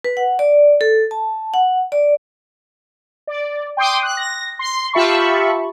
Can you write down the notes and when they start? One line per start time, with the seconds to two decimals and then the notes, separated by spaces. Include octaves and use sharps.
0.04 B4
0.17 F#5
0.39 D5
0.81 A4
1.11 A5
1.54 F#5
1.92 D5
3.27 D5
3.77 G5 C6 D6 D#6
4.03 F#6
4.17 A#6
4.59 C6
4.93 F4 G4 E5 A5 B5 C#6